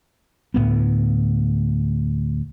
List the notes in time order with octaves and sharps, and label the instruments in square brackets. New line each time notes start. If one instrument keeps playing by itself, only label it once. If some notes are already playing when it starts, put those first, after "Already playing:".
[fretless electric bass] D2 A2 A#3 B3